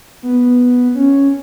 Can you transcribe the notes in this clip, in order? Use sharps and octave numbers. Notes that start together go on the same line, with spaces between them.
B3
C#4